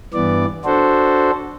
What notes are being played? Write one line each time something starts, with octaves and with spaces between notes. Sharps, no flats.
G2 E3 B3 D5
D4 F#4 A4 C5